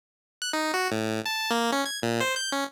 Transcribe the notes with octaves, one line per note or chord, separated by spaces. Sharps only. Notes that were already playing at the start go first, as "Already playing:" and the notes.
F#6
D#4
F#4
A2
A5
A#3
C#4
G#6
A#2
C5
G6
C#4